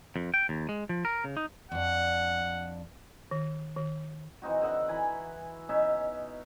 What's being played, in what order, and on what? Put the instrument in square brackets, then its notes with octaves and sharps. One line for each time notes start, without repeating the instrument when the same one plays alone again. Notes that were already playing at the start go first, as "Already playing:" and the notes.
[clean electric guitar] F2
G5
D#2
G#3
F3
A#4
C#3
D#4
[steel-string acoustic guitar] F2 D4 [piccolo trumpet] F#5
[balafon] D#3
D#3
[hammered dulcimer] E3 C4 D#4 F#4
D3 D#4 E5 F#5
E3 G#5 A#5 B5
B2 C#4 D#4 E5